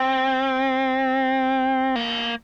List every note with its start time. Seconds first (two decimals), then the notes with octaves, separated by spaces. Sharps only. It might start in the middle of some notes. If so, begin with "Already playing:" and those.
Already playing: C4
1.96 A#3